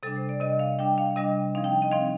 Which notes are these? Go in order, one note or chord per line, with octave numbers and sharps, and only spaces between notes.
C3 G3 D4 A4
C5
D5
C3 G3 D4 D#5
F5
C3 G3 D4 G5
F5
C3 G3 D4 D#5
F3 C4 D#4 F5
G5
D#5
F3 C4 D#4 F5